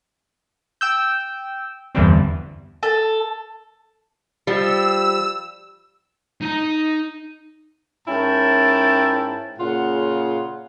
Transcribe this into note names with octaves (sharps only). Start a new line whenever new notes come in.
G5 E6 G6
E2 G2 D3 E3 G3 C4
A4
F3 G3 E6
D#4 A#5
G#2 C#4 E4 A#4 G5 A5
A#2 C#3 F4 F#5